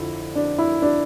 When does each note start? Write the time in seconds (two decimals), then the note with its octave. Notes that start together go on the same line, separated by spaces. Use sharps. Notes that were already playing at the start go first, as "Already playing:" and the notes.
Already playing: F2 D3 E4
0.36 D4
0.58 E4
0.82 D4